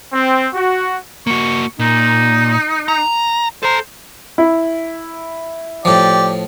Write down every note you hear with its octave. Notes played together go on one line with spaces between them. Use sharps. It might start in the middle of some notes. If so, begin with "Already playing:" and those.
C4
F#4
A#3 F#4 C#6
A#2 D#4
A#5
A4 C5 A#5
E4
A2 F3 G4 D5